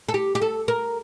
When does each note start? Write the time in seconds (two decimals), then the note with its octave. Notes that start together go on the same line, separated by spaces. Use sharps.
0.09 A4
0.14 G4
0.35 G4
0.42 A4
0.68 A#4